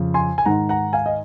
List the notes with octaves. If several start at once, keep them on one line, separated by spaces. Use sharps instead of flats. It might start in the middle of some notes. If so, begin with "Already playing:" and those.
Already playing: F2 C#3 F3
G#5 C6
G#5
G#2 D#3 F#5 A#5
F#5 A#5
F5 G#5
D#5